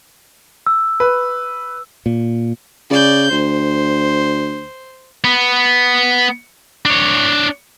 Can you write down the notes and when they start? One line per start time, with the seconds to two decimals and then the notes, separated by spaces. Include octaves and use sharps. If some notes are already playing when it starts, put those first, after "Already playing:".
0.67 E6
1.00 B4
2.06 A#2
2.90 C#3 D5 G6
3.31 D2 C5
5.24 B3
6.85 D4 C#5